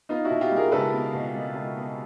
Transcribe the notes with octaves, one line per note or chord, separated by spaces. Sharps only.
B3 D#4 F4
E4 F#4
B2
F4 G4
G3 G#4 A#4
C#2 A4 B4
B3
B2
G3
C#2
B3